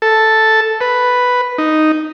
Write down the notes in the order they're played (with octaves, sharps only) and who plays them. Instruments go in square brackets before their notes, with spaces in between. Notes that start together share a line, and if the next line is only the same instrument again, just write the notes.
[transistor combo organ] A4
B4
D#4